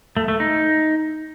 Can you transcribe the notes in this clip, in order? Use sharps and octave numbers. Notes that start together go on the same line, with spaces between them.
A3
A3
D#4